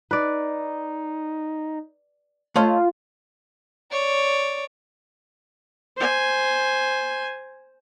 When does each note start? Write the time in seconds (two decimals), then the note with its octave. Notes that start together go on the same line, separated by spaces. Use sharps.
0.11 D#4 B4 D5
2.56 A3 F4 C#5 D#5
3.90 C#5 D5
5.97 C5 G#5